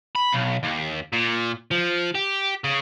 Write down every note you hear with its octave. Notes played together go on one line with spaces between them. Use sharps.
B5
B1
D#2
A#2
F3
G4
C#3